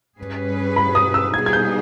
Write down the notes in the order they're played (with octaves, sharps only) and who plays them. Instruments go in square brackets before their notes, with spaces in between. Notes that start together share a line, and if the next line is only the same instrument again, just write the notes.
[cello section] G2 G3 C#4 G#4 B4
[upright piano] B5
D#6
E6
[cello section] B2 G3 B3 D#4 G#4 [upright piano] G#6
[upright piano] G#6
G6